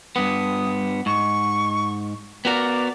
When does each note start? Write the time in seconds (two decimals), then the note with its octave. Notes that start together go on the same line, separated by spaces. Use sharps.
0.16 G2 B3 D#6
1.06 G#2 C#6
2.45 B3 F#4 A#4 D5